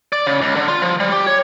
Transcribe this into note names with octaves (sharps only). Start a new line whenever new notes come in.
D5
C#3
C#2
D3
F4
F3
G3
G4
C#5